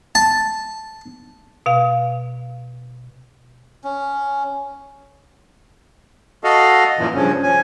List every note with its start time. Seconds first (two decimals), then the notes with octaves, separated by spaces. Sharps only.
0.15 A5
1.66 B2 F5
3.84 C#4
6.44 F#4 A4 D#5 F5
6.99 F#2 A#2 E3
7.14 G2 C#3 F3 C#4
7.43 F3 C#4 G#5